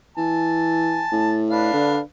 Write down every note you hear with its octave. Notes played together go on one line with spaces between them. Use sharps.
E3 G#5 A5
A2
D4 B4 F5
D3